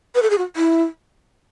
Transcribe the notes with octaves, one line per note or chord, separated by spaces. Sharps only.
B4
A4
G#4
F#4
E4